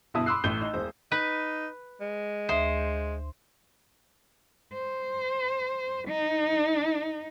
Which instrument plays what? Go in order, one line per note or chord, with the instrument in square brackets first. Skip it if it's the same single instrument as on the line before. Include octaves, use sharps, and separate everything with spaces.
[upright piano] G1 B2 E4 E5 A5 D#6
B5 C6 D6 E6 F#6 C7
A1 A3 G6 G7
D#4
E1 C5
[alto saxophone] D#4 [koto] B4
[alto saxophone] G#3
[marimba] D2 E5 D#6 [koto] C5
[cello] C5
D#4